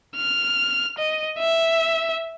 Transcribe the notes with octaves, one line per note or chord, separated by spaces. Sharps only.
F6
D#5
E5